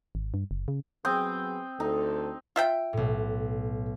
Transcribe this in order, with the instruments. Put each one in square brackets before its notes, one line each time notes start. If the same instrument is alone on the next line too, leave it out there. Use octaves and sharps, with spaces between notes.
[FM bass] G#1
G2
F#1
C#3
[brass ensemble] F#3 B3 G#4 [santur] C4 G5 D#6
[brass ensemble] D2 A4 [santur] D#4
[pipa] F4 E5 G5
[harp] B1 A2